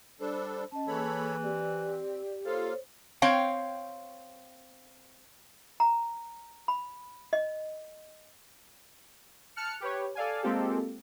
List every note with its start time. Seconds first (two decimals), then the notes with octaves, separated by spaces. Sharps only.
0.21 G3 D4 A4 C5 B5
0.72 C#4 D#5 A5
0.88 E3 A#3 G#4 A4 C#5 B5
1.43 C4 G4 D5
2.46 A#3 F4 A4 C5 C#5 F5
3.22 C4 C#5 F5 G5
5.80 A#5
6.68 B5
7.33 D#5
9.56 A5 F6 F#6 C#7
9.80 G4 B4 C#5
10.15 A4 D5 F5 G#5
10.42 G#3 A#3 C4 F4 G4 A4